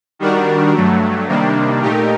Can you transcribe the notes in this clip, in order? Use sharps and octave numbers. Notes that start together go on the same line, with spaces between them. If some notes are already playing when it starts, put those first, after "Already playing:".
D#3 G3 D4 F#4 A#4
G2 F#3 A3
C3 D#3 G3 A#3 D4
A#2 A3 D#4 G4 A#4